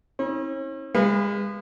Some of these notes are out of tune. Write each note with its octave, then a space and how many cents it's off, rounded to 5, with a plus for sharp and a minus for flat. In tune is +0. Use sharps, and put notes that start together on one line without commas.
C#4 -40 E4 -45
G#3 -35 B4 +0 F5 -30